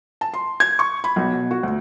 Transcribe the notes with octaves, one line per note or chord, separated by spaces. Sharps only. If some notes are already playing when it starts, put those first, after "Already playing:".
A5
C6
G#6
C#6
B5
B1
B2
F#4
D2